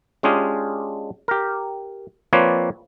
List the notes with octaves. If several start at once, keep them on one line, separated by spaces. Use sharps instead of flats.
G#3 C#4 D4 F4 G4 G#4
G4 A#4
F3 A#3 C4 B4 C#5 D5